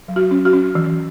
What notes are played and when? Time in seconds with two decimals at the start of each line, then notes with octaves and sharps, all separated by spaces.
0.08 F#3
0.16 F#4
0.31 C#4
0.45 F#4
0.53 C#4
0.75 E3